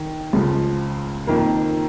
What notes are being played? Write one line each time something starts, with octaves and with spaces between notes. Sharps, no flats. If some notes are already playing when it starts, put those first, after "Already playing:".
Already playing: D#3
C#2 C#3 F3
F2 D#3 A#3